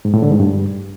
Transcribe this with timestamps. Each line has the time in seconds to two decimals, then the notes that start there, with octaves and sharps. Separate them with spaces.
0.05 G#2
0.14 A2
0.22 D3
0.31 G#2
0.40 G2